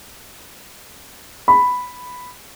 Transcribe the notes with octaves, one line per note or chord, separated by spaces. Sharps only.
B5